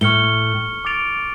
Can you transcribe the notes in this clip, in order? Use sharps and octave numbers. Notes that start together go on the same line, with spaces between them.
A2 C#6 F6 C#7 G7
D6 A6 D7 F7